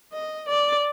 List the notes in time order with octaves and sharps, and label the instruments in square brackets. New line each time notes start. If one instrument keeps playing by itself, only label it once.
[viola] D#5
D5